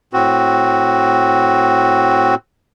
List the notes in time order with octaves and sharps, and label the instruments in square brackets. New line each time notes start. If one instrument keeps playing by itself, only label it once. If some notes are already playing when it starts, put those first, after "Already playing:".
[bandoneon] A2 C4 F#4